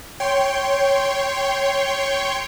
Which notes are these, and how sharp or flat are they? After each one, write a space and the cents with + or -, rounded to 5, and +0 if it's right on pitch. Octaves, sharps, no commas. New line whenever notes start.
C#5 +0 G5 +0 C6 +0